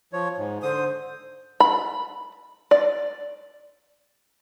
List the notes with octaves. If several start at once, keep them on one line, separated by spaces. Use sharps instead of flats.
F3 C#5
G#2
D3 C5 D#6
B5
D5